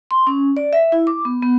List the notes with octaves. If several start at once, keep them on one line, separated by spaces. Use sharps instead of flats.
C6
C#4
D5
E5
E4
D6
B3
B3